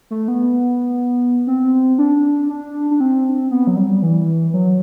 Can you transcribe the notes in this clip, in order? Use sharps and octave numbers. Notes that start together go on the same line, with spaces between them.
A3
B3
C4
D4
D4
D4
C4
B3
F#3
G3
E3
F#3